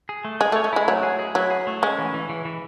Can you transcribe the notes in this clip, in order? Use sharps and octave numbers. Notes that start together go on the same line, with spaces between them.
G#4
A3
G#3 G#4
A3
C#5
A3
G#3 E4
F#3 A3
G#4
G#4
F#3 E4
G#4
A3
G#3 C#4
E3
E3
E3
E3